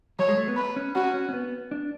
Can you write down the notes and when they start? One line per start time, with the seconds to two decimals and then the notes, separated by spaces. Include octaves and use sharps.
0.19 F#3 C#5
0.28 G#3
0.37 A3
0.48 B3
0.56 B4
0.76 C#4
0.95 C#4 F#4
1.14 C#4
1.29 C#4
1.34 B3
1.71 D4